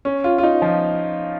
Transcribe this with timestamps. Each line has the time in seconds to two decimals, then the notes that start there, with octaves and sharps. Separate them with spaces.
0.05 C#4
0.24 F4
0.38 F4
0.43 D#4
0.62 F3